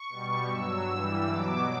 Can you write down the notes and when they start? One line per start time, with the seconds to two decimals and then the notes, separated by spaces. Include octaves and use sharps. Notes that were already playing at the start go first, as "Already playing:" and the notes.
Already playing: C#6
0.09 B2 G3
0.49 G2 F#3 E6
0.89 G2 E3 G3
1.29 B2 F#3 D6